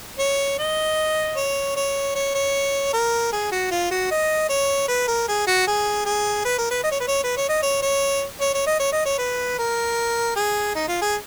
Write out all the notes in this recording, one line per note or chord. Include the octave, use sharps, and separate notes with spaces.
C#5
D#5
C#5
C#5
C#5
C#5
A#4
G#4
F#4
F4
F#4
D#5
C#5
B4
A#4
G#4
F#4
G#4
G#4
B4
A#4
B4
D#5
C#5
B4
C#5
B4
C#5
D#5
C#5
C#5
C#5
C#5
D#5
C#5
D#5
C#5
B4
A#4
G#4
D#4
F4
G#4